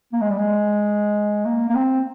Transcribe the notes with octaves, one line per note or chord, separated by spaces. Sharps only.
A#3
G#3
G3
G#3
A#3
A#3
C4